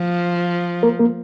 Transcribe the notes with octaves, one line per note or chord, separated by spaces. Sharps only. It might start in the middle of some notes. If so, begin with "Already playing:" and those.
Already playing: F3
A#3 A#4
A#3 A#4